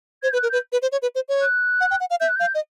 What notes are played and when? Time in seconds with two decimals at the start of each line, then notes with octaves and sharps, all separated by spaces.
0.23 C5 G#6
0.31 B4 G6
0.36 F#6
0.43 A#4
0.49 B4 G6
0.72 B4
0.82 C5
0.92 C#5
1.02 B4
1.15 C5
1.29 C#5
1.41 F#6
1.80 F#5
1.91 G5
2.00 F#5
2.10 F5
2.20 E5 G6
2.29 F#6
2.36 F5 G6
2.55 D#5